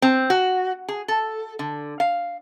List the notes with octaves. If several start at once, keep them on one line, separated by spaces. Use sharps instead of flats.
C4
F#4
G#4
A4
D3
F5